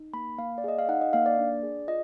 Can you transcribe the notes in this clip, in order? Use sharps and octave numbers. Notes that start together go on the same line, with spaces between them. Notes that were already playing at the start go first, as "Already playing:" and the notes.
Already playing: D#4
A#3 B5
A#3 F5
D5
G#4 D#5
F5
D#4 F#5
D#5
A#3 F5
D5
D4
G#4
F4 D#5